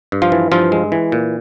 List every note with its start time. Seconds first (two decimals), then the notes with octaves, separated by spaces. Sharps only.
0.12 G2
0.22 F3 F4
0.32 E3
0.52 G2 F3 F4
0.72 G#3
0.92 E3
1.12 A#2